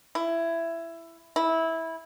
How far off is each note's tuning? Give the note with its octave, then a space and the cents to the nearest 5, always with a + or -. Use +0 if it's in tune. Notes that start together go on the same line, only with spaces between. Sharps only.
E4 +15
E4 -15